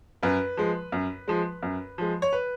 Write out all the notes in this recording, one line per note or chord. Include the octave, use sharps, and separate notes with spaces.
F#2 B4
F3 G#3
F#2
F3 G#3
F#2
F3 G#3
C#5
B4